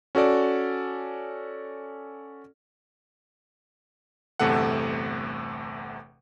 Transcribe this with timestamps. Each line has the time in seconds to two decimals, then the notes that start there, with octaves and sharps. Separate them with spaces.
0.15 C#4 F#4 A4 D5
4.39 G1 E2 C3 A3 A4 F#5